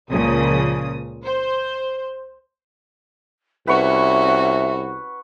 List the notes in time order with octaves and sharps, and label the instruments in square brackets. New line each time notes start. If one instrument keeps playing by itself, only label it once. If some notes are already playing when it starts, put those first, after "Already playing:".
[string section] C#2 A#2 C#3 F3 D#6
C5
[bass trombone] C2 [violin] C#4 F#4 [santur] B4 F#5 C#6 [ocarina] E5